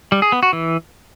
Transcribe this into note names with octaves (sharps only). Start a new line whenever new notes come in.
G3
G#4
B3
F#4
E3